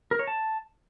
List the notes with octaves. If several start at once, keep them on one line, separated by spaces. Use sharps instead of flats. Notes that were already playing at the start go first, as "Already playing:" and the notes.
A#4
C#5
A5